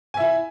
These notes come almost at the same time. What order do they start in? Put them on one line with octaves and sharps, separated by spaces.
G#5 E5 E4